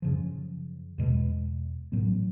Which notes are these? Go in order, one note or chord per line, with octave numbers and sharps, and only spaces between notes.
F#2 C#3 F3
E2 B2 G#3
A1 A2 F#3 B3